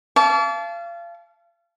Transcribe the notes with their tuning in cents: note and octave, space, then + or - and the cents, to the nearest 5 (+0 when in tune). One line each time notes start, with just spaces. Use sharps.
F5 -30 A5 -30 D6 -45